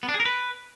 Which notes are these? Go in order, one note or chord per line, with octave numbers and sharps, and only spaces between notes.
B3
D4
G#4
A#4
B4